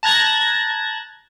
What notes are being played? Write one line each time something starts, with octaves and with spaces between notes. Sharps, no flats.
A5 A#5 F#6 G#6 A#6